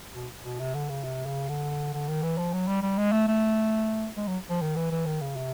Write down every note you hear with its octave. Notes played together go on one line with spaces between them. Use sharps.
B2
B2
C3
D3
C#3
C3
C#3
D3
D3
D#3
E3
F3
F#3
G3
G3
G#3
A3
A3
G#3
F#3
F3
D#3
E3
E3
D#3
C#3
C3